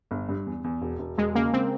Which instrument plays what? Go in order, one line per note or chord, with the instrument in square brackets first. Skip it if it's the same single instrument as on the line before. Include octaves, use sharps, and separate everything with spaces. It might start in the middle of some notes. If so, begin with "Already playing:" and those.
[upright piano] G1
G2
E2
E2
E1
E1
[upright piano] E1 [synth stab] G#3
[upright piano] C#3 [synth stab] A#3
[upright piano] C#3 [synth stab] C4